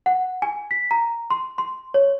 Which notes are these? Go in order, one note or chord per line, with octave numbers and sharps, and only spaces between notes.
F#5
G#5
B6
A#5
C6
C6
C#5